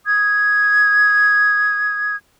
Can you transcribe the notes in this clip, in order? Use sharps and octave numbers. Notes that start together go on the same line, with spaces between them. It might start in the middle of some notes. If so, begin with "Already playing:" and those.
D#6 G#6